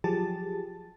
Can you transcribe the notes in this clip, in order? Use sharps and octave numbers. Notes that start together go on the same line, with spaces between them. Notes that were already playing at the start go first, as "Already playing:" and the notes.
F3 F#3 G4 G#4 A5 A6